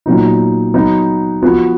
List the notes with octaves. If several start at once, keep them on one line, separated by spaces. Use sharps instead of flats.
A#2 F#3 B3 D#4
F#3 B3 D#4
F3 B3 F#4